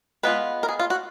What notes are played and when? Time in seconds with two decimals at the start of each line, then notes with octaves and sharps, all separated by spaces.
0.23 G#3 B3 F4 B4
0.63 A#4
0.69 G#4
0.79 F4
0.90 F#4